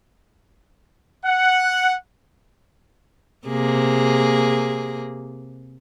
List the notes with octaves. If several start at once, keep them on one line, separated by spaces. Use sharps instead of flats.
F#5
C3 A#3 G#4